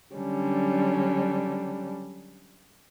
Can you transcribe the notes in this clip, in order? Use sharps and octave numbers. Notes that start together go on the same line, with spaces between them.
D3 F#3 G3 C#4 D4